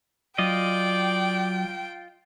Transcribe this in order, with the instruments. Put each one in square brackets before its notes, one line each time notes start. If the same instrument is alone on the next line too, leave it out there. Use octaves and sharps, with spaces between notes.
[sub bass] F#3 [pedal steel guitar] F4 D#5 [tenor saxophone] D5 [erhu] G5